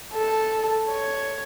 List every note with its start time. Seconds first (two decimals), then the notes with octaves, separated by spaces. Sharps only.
0.13 A4
0.89 C#5